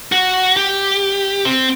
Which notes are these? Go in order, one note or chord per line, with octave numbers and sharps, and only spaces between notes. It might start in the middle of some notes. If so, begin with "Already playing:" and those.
F#4
G4
C4